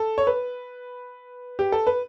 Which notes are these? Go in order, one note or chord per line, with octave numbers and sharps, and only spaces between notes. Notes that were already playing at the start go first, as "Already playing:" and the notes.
Already playing: A4
C#5
B4
G4
A4
B4